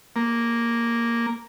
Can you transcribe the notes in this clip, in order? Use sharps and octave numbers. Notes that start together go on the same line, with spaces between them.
A#3